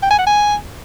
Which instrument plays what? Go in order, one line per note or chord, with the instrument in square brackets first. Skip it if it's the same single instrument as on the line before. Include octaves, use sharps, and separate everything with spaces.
[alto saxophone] G5
G#5
F#5
G#5